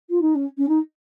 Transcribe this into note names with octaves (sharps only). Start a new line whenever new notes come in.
F4
D#4
C#4
C#4
D#4